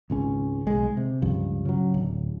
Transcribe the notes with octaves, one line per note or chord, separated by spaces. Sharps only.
G#1 C#2 C#4
B1 G#3
C3
C#2 G2 F3
C#3 F#3
D1